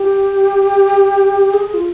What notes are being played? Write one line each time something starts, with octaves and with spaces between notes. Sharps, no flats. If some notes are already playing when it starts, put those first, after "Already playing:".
Already playing: G4
G#4
F4